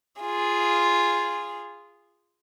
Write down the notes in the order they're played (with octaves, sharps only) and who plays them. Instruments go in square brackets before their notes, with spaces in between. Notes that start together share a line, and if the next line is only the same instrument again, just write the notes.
[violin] F4 G#4